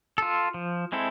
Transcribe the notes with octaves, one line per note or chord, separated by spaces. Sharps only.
F4 A4
F3
G#3 C4 E4 A4